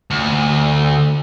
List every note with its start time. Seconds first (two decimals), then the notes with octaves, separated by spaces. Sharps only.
0.10 D2